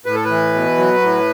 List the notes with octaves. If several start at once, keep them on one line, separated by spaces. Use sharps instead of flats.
A2 B4
A4
E3 B4
B2
F#3
A2